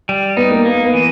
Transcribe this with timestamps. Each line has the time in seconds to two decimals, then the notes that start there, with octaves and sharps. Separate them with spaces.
0.09 G3
0.37 B3 D#4
0.51 A#3
0.65 A#3 B3
0.85 B3
0.94 E3